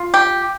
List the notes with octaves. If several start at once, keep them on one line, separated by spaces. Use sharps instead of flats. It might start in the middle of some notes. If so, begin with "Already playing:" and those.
Already playing: F4
G4